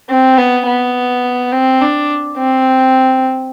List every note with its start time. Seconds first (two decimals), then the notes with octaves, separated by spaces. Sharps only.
0.09 C4
0.38 B3
0.66 B3
1.52 C4
1.81 D4
2.38 C4